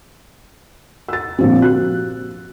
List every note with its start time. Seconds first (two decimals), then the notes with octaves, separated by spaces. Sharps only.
1.09 E6 A6
1.39 A#2 D3 F3 G3 C4
1.61 F#4 F#6